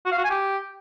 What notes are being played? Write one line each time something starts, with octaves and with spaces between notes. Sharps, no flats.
F#4
F5
F#4
G#5
G4